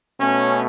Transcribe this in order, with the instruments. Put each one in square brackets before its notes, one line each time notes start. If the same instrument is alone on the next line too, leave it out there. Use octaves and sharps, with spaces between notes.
[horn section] B2 A3 C#4